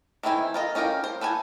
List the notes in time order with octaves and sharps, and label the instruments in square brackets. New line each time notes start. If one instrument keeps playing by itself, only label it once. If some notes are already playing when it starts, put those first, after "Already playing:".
[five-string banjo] D#3 E3 C4 E4 G#5
F4 A#4 D#5
C#4 D#4 F4 A#4 G5
C5
A4 B4 F#5 G#5